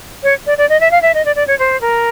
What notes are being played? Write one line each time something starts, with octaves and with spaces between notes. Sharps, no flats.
C#5
D5
D5
D#5
E5
F5
E5
D#5
D5
D5
C#5
C5
A#4